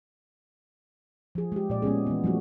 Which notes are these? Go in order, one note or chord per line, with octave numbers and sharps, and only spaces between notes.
F3 G#4
G#3 G4
A#2 D5
G#3 B3 C#4 G#4
E3 B3
F3 G3 A3 F#4